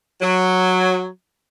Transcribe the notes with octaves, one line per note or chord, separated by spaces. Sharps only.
F#3